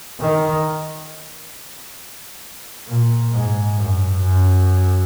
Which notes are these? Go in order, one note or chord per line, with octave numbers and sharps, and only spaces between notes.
D#3
A#2
G#2
F#2
F#2